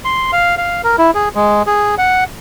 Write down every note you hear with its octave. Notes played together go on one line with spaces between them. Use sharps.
C6
F5
F5
A#4
E4
G#4
G#3
G#4
F#5